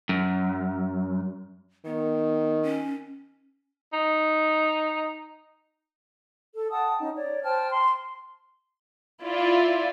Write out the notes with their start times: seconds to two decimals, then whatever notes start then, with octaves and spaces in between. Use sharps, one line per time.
0.09 F#2
1.85 D#3 B3
2.63 C#4
3.93 D#4
6.54 A4
6.70 F#5 G5 A5 D#6
6.98 C#4 D#4
7.14 C#5 D5
7.42 C5 G5 A5 F6
7.71 C6
9.25 E4 F4 D5